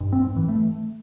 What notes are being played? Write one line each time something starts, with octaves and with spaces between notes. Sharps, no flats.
G2
C4
G#2
E3
A3